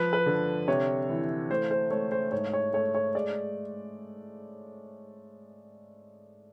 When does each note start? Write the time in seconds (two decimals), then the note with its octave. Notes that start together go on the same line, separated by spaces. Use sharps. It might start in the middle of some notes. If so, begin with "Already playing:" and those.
Already playing: F3 B4
0.13 B4
0.26 D3
0.68 C3 C#5
1.09 E3
1.50 A3 C5
1.71 C5
1.91 A3 C#5
2.12 C5
2.32 G#2 C#5
2.53 C#5
2.73 A3 C#5
2.95 C#5
3.15 G#3 D5